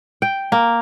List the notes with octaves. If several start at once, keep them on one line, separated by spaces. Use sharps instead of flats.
G5
A#3